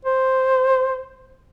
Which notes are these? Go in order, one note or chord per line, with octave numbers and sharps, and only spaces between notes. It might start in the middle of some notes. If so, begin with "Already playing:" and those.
C5